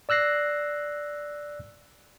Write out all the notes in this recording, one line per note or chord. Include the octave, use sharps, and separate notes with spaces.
D5 E6 F#6 A#6 C7